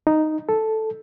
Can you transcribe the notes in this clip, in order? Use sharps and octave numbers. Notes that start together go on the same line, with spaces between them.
D#4
A4